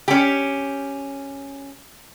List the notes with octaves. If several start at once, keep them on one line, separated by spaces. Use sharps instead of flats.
C#4 G4